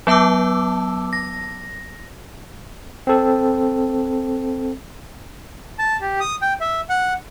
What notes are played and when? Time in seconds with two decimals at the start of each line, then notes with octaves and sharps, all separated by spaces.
0.07 F#3 B3 A5 D6 E6
1.13 A#6
3.07 C4 A4
5.79 A5
6.01 G4
6.20 D#6
6.42 G5
6.61 E5
6.89 F#5